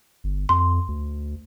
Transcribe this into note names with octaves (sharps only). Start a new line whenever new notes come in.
G1
F2 C6
D2